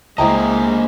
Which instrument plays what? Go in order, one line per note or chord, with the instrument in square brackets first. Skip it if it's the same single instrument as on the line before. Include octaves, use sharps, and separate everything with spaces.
[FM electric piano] C#2 [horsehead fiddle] G#3 [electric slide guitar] A#3 C5 D#5 [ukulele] E4 G5 A#5